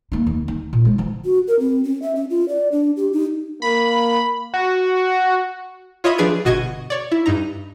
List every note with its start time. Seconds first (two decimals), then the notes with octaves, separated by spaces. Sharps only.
0.12 A#3 D#4
0.26 D#2
0.48 D#4
0.73 A#2
0.85 G#3 E4
0.98 E3 F3
1.25 F#4
1.48 A#4
1.60 C4
1.84 C#4
2.02 E5
2.15 C#4
2.30 F4
2.48 D5
2.72 D4
2.97 G4
3.13 D#4
3.62 A#3 B5
4.54 F#4
6.04 F4 C#5 D#5 E5 B5 D#6
6.18 F3 D4 G#4 B4 G#6 D7
6.44 G1 B2 F#4 D#5 C#6 G#6
6.90 C#5 D5
7.11 E4
7.26 G2 D#4 A#5